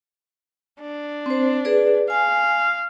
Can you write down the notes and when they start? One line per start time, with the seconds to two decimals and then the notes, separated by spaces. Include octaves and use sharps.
0.81 D4
1.26 C4 C5
1.65 G#4 B4 D5
2.10 F5 G#5